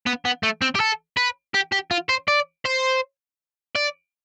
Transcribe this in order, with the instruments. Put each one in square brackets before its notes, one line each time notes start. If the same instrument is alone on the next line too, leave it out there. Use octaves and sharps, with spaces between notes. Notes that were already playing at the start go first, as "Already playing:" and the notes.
[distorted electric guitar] B3
B3
A3
C4
G4
A4
B4
G4
G4
F4
C5
D5
C5
D5